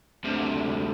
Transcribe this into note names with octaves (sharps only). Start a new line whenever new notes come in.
D2 C3